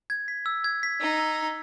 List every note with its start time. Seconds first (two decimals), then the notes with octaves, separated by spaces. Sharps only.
0.10 G#6
0.28 B6
0.46 E6
0.64 G#6
0.83 B6
1.01 D#4 E6
1.19 E6
1.37 E6